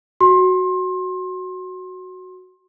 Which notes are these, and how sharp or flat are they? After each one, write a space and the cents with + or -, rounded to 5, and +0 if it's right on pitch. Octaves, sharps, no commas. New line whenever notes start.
F#4 +0 C6 +25